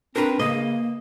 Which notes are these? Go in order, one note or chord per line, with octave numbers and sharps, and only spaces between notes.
C4 D4 A#4 B4
C#3 A#3 D#5